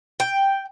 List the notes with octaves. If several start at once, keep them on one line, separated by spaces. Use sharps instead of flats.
G5